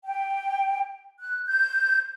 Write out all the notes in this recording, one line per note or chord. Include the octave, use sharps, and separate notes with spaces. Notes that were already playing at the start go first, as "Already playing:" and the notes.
G5
F#6
G6